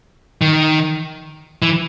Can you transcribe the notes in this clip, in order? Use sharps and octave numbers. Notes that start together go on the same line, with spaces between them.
D#3
E3